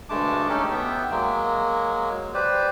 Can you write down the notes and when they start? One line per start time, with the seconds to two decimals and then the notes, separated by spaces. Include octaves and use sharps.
0.09 D2 G2 G#3 A3 A5 D6
0.49 C#4 D#4 G4 A4
0.71 B3 E5 G5
1.11 F#3 G#3 A#3
2.34 G4 B4 C5 D5